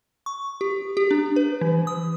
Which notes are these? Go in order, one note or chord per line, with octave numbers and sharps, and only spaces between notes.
C#6
G4
G4
D4
B4
E3
D#6